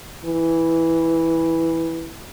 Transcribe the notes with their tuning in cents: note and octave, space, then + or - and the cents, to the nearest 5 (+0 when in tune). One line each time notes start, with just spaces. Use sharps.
E3 -5